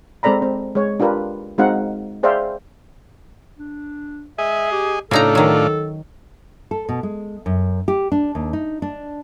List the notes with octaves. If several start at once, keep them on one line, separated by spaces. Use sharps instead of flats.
G#3 C4 A4 D5 A#5 B5
C4
G#3 C#5
D4 F4 G4 A#4 B4
G#3 C4 D#4 F#4 F5 F#5
G#4 C5 D5 E5 F5 G5
D4
G#4 D#5 E5
G4
A2 C#3 D4 D#4 F4 A4 A#5
D#3 F#3
A4
B2
G#3
F#2
G4
D4
D#2
D#4
D4